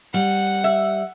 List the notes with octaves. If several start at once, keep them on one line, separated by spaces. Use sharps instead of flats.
G3 F#5
E5